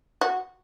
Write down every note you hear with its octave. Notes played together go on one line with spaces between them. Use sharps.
F#4